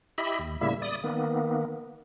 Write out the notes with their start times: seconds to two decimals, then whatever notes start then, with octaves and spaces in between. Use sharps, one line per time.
0.18 E4 G4 D#5 E5 B5
0.39 D#2
0.61 A2 C#3 G3 A#3 E4 E5
0.82 D5 D#6
1.04 D#3 A#3 B3